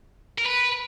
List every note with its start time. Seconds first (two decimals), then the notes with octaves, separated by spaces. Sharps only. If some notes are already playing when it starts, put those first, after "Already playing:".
0.38 A#4
0.46 B4